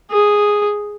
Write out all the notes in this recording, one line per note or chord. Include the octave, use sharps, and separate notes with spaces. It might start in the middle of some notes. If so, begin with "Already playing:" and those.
G#4